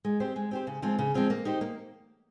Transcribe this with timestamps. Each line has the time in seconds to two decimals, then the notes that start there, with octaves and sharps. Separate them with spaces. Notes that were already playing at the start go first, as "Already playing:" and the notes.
0.05 G#3
0.20 C4 G4 C5
0.36 G#3
0.51 C4 G4 C5
0.67 C#3
0.82 F3 G#3 C4 F4
0.99 C#3
1.14 F3 G#3 C4 F4
1.30 A#3
1.45 D#4 G4 C5
1.61 A#3